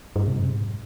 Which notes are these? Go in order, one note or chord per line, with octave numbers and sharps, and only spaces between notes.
G2
C3
F#2
G#2